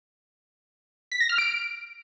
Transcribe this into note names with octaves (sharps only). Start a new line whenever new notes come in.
B6
A#6
F6
D7